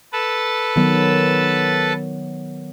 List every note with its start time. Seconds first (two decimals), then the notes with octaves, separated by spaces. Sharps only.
0.13 A4 B4 A5
0.76 D#3 F#3 B3